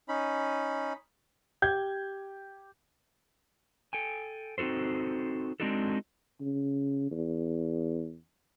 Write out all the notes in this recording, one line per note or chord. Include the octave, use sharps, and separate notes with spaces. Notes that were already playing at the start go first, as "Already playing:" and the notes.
C#4 D#4 B5
G4 G6 G#6
A4 G5 G#5
C4 D#4 F#4 A4 C5
G#3 C4 D4 D#4 F#4 A4
C#3
E2